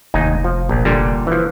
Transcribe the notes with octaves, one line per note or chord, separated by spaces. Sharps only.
F1 D#2 D#4 G#5
F3
A#1
A#2 D3 G3
E3 F3